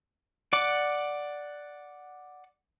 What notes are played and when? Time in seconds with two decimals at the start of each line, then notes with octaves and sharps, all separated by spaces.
0.53 D5 F#5 D6